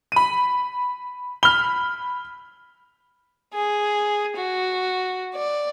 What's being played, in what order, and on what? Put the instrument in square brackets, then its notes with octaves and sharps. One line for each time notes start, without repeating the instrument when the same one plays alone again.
[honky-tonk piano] B5 D#7
[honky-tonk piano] B5 [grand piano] F6 G7
[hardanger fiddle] G#4
F#4
D5